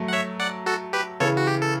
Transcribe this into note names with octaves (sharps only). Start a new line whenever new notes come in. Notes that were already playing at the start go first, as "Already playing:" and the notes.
Already playing: F#3 A3
F#5
C#5 E5
D5 F#5
F#4 A4
G4 B4
C#3 E3 A4 C#5
F#4
G4
A4